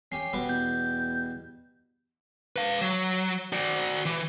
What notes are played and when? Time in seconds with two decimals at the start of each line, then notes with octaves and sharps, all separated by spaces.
0.12 C#4 G4 G5 C7
0.33 B2 G3 D6
0.49 E2 G6
2.56 B4 F5
2.81 F#3
3.53 F#4 D5
4.06 E3